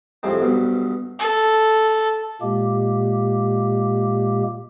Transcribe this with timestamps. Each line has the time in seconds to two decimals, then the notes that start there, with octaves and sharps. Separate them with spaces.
0.23 F2 A2 C3 F3 G#3 C4
0.42 B1 G2 B2
1.19 A4
2.41 A#2 G#3 A#3 G4